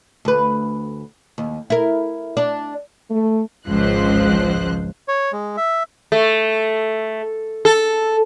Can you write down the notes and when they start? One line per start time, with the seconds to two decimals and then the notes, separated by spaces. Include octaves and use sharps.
0.25 D2 B4
1.38 D#2
1.70 E4 A#4
2.37 D4 D5
3.09 A3
3.69 G#1 C#2 F3 C5 F#6
5.08 C#5
5.33 G#3
5.57 E5
6.12 A3
7.65 A4